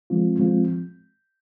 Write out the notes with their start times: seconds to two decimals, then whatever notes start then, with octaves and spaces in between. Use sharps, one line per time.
0.10 F3 G#3 C4 F4
0.39 F3 G#3 C4 F4